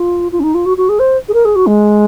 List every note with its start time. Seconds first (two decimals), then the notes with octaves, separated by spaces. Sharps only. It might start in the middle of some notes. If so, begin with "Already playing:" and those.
Already playing: F4
0.32 F4
0.39 C#4
0.43 D#4
0.54 F4
0.65 F#4
0.77 F#4
0.89 G#4
0.99 C5
1.28 G#4
1.34 A#4
1.45 G#4
1.55 F#4
1.66 G#3